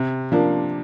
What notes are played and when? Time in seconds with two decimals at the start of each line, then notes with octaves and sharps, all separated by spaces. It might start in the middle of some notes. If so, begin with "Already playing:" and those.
Already playing: C3
0.32 F3 A#3 D4